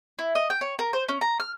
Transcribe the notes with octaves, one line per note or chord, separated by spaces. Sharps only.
E4
D#5
G5
C#5
A#4
C5
C#4
A#5
F6